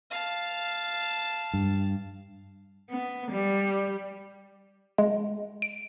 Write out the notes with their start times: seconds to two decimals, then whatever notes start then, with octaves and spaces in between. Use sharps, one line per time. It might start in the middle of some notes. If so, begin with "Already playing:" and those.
0.11 F5 A5
1.53 G2
2.90 B3
3.31 G3
4.98 G#3
5.62 D7